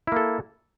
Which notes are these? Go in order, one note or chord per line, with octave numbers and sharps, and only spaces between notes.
A#3 E4 A4